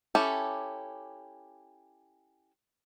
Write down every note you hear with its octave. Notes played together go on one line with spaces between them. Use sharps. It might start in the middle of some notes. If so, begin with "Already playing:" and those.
C#4 E4 G4 A4